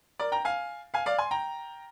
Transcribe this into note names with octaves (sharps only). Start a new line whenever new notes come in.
A#4 D5
G5 A#5
F5 G#5
F5 G#5
D5 F5
G#5 C6
G5 A#5